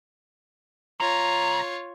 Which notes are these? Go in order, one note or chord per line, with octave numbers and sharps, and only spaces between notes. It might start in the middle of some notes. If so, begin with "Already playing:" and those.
C2 F4 C#5 A#5